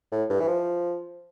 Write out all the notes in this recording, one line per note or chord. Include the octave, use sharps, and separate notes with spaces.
A2
G2
E3
F3